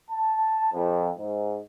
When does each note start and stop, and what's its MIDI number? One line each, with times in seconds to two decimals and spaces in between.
0.11 0.71 81
0.73 1.10 41
1.19 1.59 44